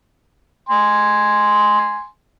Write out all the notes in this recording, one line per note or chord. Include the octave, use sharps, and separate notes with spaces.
G#5 C6